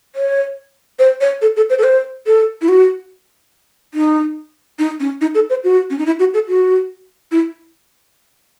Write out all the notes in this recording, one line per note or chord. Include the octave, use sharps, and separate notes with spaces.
C#5
C5
C#5
A4
A4
C5
A4
C5
A4
E4
F#4
D#4
D#4
C#4
D#4
A4
C5
F#4
C#4
D#4
E4
F#4
A4
F#4
E4